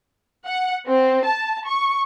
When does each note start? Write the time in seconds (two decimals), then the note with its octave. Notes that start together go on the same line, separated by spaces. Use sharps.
0.45 F#5
0.87 C4
1.25 A5
1.66 C#6